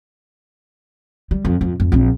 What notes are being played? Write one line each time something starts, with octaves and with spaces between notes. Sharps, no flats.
G3
F2
F2
F2
A#1 C4